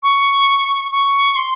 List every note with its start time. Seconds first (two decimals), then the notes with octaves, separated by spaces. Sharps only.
0.03 C#6
0.92 C#6
1.36 C6